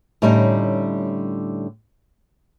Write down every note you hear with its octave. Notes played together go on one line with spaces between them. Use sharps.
A2 D3 G3 C#4 D#4